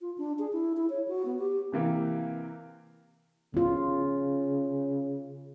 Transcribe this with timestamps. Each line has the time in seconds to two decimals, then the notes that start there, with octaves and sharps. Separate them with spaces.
0.01 F4
0.18 D4
0.39 G#4
0.53 E4
0.77 E4
0.90 C#5
1.08 F#4
1.25 B3
1.39 G4
1.72 C3 E3 A#3 G4
3.54 C#3 B3 F4